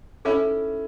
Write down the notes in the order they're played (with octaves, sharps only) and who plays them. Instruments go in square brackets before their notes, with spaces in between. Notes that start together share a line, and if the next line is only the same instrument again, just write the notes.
[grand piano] C#4 E4 [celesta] A4